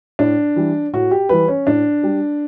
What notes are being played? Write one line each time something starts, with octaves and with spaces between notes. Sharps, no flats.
A2 D4
E3 G3
A2 F#4
G4
E3 G3 B4
C#4
A2 D4
G3